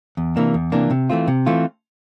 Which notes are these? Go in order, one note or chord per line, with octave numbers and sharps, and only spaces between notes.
E2
C3 E3 A#3 D4
E2
C3 E3 A#3 D4
C3
E3 A3 C4 F4
C3
E3 A3 C4 F4